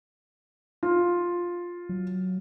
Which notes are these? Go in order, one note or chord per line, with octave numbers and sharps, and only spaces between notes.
F4
F#3